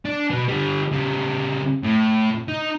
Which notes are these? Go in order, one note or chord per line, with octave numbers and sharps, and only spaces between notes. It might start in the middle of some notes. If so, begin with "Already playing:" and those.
D4
B2 B3
D3 G3
C#3 G3
A2
D#4